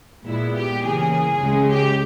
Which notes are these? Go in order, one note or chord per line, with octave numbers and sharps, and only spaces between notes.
A#2 G#3 B3 E4
G4
C#3 E3 A#3 G#4
C#2 C#3 G#3
G4